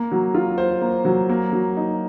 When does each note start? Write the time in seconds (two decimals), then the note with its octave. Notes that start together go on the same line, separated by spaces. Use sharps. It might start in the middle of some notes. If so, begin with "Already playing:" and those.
Already playing: A#3
0.12 F#3
0.35 F4
0.58 C5
0.82 A#3
1.05 F#3
1.29 A#3
1.53 F#3
1.77 D#4